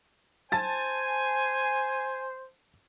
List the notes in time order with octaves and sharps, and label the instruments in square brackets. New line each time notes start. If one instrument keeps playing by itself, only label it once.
[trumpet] C5 [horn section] G#5 [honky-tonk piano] A5 A6